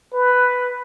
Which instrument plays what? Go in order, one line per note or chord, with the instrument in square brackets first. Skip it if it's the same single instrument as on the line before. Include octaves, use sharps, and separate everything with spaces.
[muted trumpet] B4